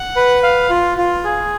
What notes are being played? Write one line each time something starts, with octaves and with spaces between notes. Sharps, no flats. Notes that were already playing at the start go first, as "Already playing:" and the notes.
Already playing: F#5
B4
F5
F4
F4
G#4